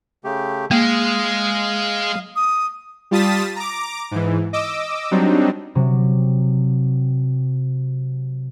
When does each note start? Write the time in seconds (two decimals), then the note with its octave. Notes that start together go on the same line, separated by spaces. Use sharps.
0.24 C#3 A3 G4
0.71 G#3 A#3 F5 D#6
2.36 D#6
3.11 G3 F4 A5 D#6 A6 B6
3.56 A#5 D6
4.11 G#2 E3
4.53 D#5 D6 E6
5.11 F#3 G3 C4 D4 D#4
5.75 C3 F#3